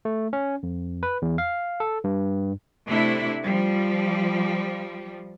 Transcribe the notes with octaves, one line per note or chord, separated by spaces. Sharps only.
A3
C#4
F2
B4
E2
F5
A4
G2
C3 A3 D4 E4
F3 G3